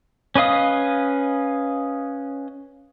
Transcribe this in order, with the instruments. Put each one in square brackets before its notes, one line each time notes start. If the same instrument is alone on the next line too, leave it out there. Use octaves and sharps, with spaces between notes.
[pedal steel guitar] C#4 B4 D#5 F5 D#6